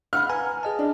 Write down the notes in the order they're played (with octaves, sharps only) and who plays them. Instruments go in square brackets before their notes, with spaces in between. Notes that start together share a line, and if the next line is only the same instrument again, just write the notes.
[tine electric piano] F5 F#5 B5 [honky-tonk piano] F6
[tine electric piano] B4 G#5 A#5
G#4 D#5 A5
[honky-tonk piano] D4